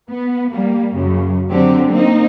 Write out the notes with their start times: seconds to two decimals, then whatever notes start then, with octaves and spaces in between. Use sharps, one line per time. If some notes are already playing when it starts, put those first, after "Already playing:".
0.10 B3
0.52 G3 A#3
0.95 F#2 C#3
1.50 D3 F#3 C4 G4
1.90 A#3 C4 D#4